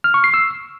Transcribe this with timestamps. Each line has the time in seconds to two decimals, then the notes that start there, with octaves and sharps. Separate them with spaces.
0.04 F6
0.14 C#6
0.24 C7
0.34 E6